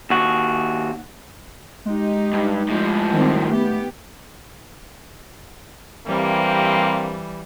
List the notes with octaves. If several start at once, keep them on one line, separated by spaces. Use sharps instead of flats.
D#2 F#4
G#3 D#4 G4
G2
A2 F3
D#3 G3 C4
A3 B3 G4
G2 E3 G3 A#3 C4